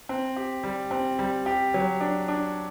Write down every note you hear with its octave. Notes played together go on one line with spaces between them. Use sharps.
C4
G4
G3
C4
G3
G4
F#3
D4
D4